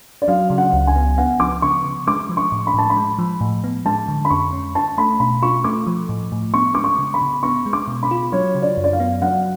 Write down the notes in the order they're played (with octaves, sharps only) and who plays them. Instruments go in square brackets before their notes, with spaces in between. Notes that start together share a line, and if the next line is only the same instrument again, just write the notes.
[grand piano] D5
[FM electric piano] F#3 [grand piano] F5
[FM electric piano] C#3
[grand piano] F#5
[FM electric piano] C#2
[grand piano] G#5
[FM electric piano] B3
[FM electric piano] B3 [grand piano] F#5
[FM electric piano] F3 [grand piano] D6
[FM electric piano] C#3 [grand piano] C#6
[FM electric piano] C#3
[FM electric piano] G#3 [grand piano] D6
[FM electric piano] F3
[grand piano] C#6
[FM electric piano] A2
[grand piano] B5
[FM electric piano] A2 [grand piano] A5
[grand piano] B5
[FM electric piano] G#3
F3
A2
B3
[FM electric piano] G#3 [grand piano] A5
[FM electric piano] D3
[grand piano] B5
[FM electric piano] F2 [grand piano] C#6
[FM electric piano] C#4
[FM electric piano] C#4 [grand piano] A5
[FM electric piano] A3 [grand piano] B5
[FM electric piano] B2 [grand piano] B5
[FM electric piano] F4 [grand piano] C#6
[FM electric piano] A3 [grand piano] D6
[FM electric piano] F3
A2
A2
[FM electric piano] B3 [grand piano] C#6
[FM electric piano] G#3 [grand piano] D6
[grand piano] C#6
[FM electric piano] C#3
[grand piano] B5
[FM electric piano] C#3
[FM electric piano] B3 [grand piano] C#6
[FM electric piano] G#3
[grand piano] D6
[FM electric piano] B2
[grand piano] B5
[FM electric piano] F4
[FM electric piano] F#3 [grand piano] C#5
[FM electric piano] C#3
[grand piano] D5
[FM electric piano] F#2
[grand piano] D5
F5
[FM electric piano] B3
[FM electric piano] F#3 [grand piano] F#5